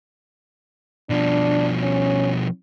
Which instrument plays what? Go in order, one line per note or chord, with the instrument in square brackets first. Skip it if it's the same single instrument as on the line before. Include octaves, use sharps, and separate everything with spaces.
[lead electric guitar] B2 F3 [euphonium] D4
[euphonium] C#4